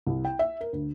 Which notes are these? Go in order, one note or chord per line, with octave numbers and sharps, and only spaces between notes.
C2
G5
E5
A#4
D2